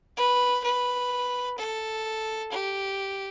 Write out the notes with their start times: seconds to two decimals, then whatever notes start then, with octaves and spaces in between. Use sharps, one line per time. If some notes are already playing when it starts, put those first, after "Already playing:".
0.17 B4
0.64 B4
1.58 A4
2.52 G4